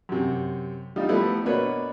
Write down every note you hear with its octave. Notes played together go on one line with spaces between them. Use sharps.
F#2 C3
G3 D#4 F4
F3 G3 A3 B3 E4
B2 A#3 D4 B4 C#5